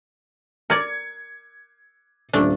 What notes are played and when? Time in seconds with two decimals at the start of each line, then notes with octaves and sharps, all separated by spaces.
0.70 A#4 D5 G#6 C#7
2.33 D#1 A3 D4